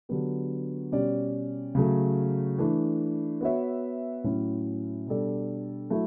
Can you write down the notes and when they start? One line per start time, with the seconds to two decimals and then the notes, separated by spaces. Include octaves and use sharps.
0.09 D3 F#3 B3 D4 G4
0.92 B2 G3 C#4 G4 D5
1.75 C#3 F#3 A3
2.58 E3 A3 D4
3.41 B3 F#4 C#5 E5
4.24 A2 F#3 C#4 E4
5.07 B2 G3 D4 A4 D5
5.90 F#3 A3 E4